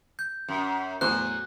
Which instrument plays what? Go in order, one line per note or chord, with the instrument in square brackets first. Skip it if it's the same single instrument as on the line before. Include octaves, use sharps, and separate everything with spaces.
[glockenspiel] G6
[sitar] F#2
[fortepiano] E2 A2 C5 [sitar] F#3 [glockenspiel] F#6